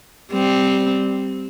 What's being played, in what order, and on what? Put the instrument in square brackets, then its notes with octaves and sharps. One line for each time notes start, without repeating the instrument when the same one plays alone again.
[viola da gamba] G3 C4